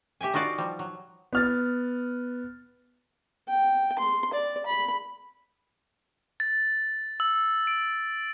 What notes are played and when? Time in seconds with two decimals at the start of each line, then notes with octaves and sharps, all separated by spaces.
0.21 G4 E5 G5 G#5
0.34 D#4 F4 F#4 B4 D5 F5
0.58 F3 G3
0.79 F#3
1.33 B3 F6 A6
3.49 G5
3.99 C6
4.34 D5
4.66 B5
6.40 A6
7.20 E6
7.67 D7